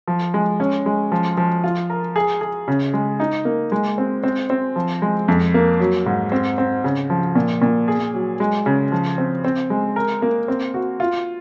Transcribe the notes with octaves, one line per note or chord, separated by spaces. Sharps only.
F3
G#3
C#4
G#3
F3
F3
F4
A#4
G#4
G#4
C#3
G#3
D#4
A#3
G#3
C4
C4
C4
F3
G#3
F2
A#3
F#3
G#2
C4
C4
C#3
F3
A#2
A#2
G#4
F#3
G#3
C#3
F3
C4
C4
G#3
A#4
A#3
C4
F#4
F4